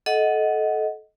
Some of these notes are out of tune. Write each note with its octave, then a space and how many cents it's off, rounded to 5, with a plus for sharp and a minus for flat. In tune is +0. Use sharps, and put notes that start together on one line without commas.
A4 -20 D#5 +10 F#5 +0